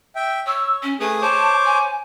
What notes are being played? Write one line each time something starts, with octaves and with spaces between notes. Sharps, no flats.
E5 G5
C#5 E6
C#4
A3 G#4 B4 D#6
C5 C#5 A5 D6
G#5